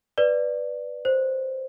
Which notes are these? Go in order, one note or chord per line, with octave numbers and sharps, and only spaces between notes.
B4 D5
C5